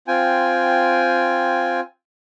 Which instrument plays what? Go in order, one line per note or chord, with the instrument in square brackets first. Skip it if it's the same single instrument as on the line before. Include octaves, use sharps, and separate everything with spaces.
[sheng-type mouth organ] C4 F4 G5 G#5